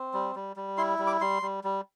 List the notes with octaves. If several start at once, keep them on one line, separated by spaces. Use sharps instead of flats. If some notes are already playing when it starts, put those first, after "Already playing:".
Already playing: C4
G3
G3
G3
E4 C6
G3
D6
G3 C6
G3
G3